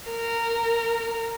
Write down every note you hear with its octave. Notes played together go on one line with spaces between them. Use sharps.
A#4